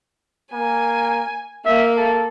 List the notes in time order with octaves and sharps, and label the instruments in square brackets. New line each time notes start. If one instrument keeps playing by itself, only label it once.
[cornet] A#3 [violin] G#5
[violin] A#3 F5 [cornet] E5
[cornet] A4